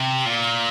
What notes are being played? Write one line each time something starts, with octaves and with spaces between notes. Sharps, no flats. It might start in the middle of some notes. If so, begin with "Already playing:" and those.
Already playing: C3
A#2